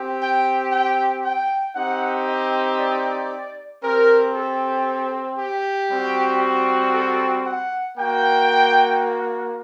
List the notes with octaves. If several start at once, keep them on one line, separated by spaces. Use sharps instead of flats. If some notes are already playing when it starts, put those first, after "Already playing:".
Already playing: C4 G4
G5
G5
G5
C4 D#4 G4 F#5
D#5
D5
C4 G4 A#4
A4
G4
G3 C4 F#4
A4
F#5
A#3 F#4 G5